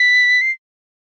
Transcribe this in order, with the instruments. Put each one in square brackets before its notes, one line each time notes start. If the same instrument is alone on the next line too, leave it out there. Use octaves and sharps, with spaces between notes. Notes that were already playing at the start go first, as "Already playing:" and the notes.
Already playing: [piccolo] B6
C7